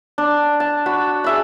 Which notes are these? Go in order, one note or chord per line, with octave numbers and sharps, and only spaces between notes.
D4
A5
F#4 B5
G#4 E5 B5